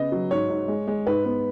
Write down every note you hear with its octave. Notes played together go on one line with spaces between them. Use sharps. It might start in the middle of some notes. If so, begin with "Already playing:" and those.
Already playing: C#3 B3 D#5
F#3
G#2 C#5
G#2
G#3
G#3
G#2 B4
B3